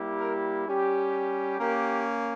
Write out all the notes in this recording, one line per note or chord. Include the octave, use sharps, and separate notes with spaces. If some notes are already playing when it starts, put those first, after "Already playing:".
Already playing: G3 A#3 E4 G4
A#4
G3 C#4 G4
A#3 C#4 G4 A#4